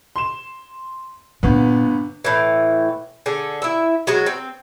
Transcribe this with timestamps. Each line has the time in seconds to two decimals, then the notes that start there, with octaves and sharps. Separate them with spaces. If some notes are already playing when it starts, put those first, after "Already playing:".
0.16 C6 E7
1.43 G1 A#2 A#3 B3
2.25 A2 E3
3.26 D3 G#4 A4
3.62 E4 E5
4.07 F#3 G#3 F#4
4.26 C4